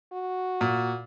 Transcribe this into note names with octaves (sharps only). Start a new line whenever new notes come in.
F#4
A#2